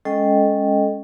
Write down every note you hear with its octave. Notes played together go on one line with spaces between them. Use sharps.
G#3 C#4 A4 D#5 G5